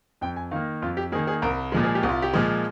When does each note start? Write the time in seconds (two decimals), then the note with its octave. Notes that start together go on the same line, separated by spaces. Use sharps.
0.21 F2 G5
0.36 G#5
0.51 D#3 A#3 F5
0.82 F2 F4
0.97 G4
1.12 A#3 G#4
1.15 D#3
1.27 G#4
1.42 C2 A#4
1.72 A#2 F3 G#3
1.83 G#4
1.95 G4
2.03 C2
2.09 F4
2.22 G4
2.33 A#2 F3 G#3